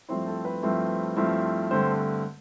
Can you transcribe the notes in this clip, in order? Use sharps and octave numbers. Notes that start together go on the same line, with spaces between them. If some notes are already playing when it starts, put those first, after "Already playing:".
G2 F3 A3 C4 E4 C5
A4
B4
G2 F3 A3 C4 E4
G2 F3 A3 C4 E4
G2 D3 A3 C4 C5